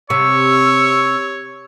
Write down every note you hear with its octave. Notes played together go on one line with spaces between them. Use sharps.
C3 C#5 C#6 E6